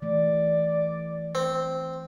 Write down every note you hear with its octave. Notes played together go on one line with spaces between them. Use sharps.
E3 A3 D5
C4